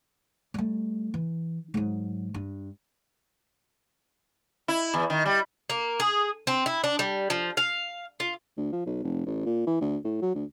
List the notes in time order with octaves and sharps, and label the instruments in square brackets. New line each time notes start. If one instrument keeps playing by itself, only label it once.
[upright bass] G3 A3
E3
G#2 F#3
G2
[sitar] E4
E2
D#3
G3
[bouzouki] A#3
G#4
C4
E4
D4
G3
F3
F5
F4
[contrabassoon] D2
F3
B1
F1
A1
A#2
E3
D2
A2
F#3
D2